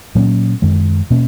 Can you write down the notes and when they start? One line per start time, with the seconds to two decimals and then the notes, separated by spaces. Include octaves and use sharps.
0.15 A#2 F#3 A#3 C#4
0.62 F#2 D#3 G#3
1.10 B2 A#3 C#4